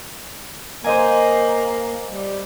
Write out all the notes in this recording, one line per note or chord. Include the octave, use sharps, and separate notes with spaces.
A#3 C5 D#5 G#5
G3